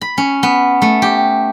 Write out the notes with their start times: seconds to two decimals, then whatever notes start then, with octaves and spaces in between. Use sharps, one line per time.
0.01 B5
0.18 C#4
0.43 B3
0.82 A3
1.02 G4